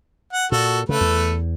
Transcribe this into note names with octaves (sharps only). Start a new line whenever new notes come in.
F#5
A#2 F#4 A4
C#3 A3 A4 B4
E2